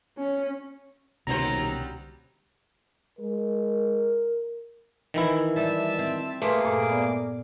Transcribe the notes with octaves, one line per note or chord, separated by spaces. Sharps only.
C#4
D#1 C2 B2 D3 F#3 G3 C5 A#5
G#3 A#4
D#3 E3 E4
G3 E5 A5
C4
A3 A#3 G#4 B4 C5 D6
G2 A#2 A4
B3 D5